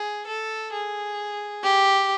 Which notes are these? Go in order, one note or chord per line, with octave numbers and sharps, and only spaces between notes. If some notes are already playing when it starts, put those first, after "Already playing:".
Already playing: G#4
A4
G#4
G4